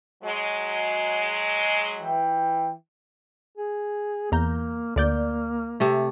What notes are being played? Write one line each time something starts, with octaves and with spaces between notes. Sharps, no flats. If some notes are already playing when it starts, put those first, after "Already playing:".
F#3 G#3
E3 G5
G#4
E2 A#3 A#5 G6
D2 A#3 D5 G6
C3 A3